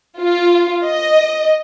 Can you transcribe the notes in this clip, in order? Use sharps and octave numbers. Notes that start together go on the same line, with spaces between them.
F4
D#5